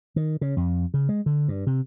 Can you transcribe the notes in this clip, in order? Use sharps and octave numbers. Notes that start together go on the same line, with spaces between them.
D#3
C#3
F2
C#3
G#3
D3
G2
C3